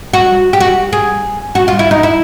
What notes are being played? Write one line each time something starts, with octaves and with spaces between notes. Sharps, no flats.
F#4
G4
F#4
G#4
F#4
F4
E4
D#4
E4